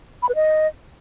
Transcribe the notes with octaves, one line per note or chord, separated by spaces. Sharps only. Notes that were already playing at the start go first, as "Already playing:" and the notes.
B5
B4
D#5